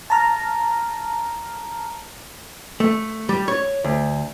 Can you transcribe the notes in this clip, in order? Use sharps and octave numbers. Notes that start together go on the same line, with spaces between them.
A5 A#5 F6
A3
G3
C#5
D2